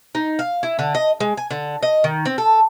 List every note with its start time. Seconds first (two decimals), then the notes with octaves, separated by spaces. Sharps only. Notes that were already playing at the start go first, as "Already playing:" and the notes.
0.15 D#4
0.39 F5
0.63 E4
0.79 D3
0.95 D#5
1.20 G#3
1.37 G#5
1.51 D3
1.83 D#5
2.04 D#3
2.25 C4
2.38 A4